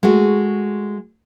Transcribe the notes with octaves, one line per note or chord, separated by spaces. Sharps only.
G#3 A3 F#4